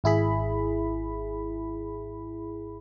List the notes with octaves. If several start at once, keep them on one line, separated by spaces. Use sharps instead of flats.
G#1 E4 G#4 B5